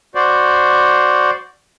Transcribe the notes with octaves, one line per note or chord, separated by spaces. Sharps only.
F#4 C5 D5